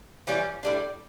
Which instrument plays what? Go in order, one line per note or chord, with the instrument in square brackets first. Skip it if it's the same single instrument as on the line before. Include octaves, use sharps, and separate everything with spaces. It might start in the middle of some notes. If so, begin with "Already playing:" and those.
[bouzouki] E3 G3 C#4 F4
A2 G3 D4